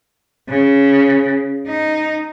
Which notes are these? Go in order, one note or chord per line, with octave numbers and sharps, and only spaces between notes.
C#3
D#4